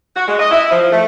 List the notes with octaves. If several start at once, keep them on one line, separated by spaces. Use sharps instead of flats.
F#4
G#3
D#5
E4
F3
A3